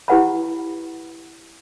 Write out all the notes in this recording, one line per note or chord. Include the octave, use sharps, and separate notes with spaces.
E4 G4 B4 F#5 B5